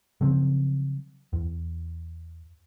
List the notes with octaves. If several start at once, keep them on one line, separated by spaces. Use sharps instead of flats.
C#3 F3 F#3 C4
E2